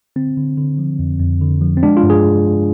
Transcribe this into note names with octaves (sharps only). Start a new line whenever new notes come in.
D3 C4
D3
D3
F3
F2
F2
D3
F3
C4
G#3 D4
F4
G2
G#4